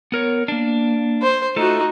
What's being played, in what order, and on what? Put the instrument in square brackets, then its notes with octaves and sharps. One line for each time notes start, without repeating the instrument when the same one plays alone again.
[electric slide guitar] B3 A#4 C#5
A#3 D4
[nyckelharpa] C5
[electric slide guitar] A3 F4 A4 [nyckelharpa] D#4 F#4